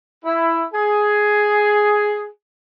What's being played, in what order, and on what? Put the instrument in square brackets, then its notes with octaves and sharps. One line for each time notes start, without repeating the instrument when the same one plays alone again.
[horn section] E4
G#4